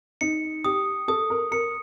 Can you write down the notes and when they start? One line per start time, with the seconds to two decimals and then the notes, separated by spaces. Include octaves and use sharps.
0.21 D#4 C#7
0.64 G4 D#6
1.08 A4 D#6
1.30 A#4
1.51 A#4 C#7